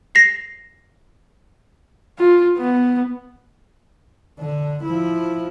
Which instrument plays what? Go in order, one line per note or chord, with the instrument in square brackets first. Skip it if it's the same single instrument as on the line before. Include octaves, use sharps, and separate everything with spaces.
[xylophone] A#6 C7
[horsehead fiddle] F4
B3
[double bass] D3
F3 E4